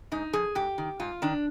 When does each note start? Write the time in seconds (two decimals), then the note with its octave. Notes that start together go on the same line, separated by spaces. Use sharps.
0.12 G#2 D#4
0.33 F3 G#4
0.55 G#2 G4
0.78 D#3
1.00 G#2 F4
1.22 D#3 D4